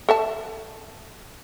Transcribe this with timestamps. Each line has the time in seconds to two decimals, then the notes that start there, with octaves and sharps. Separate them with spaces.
0.09 A4 E5 A5